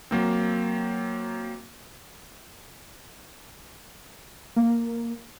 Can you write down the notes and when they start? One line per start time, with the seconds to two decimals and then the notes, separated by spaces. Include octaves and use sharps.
0.11 F#3 A#3 C4
4.56 A#3